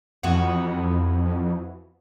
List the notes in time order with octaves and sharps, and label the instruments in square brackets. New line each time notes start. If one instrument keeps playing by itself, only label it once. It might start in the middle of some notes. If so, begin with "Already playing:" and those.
[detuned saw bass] F2 [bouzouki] E3 B3 F#4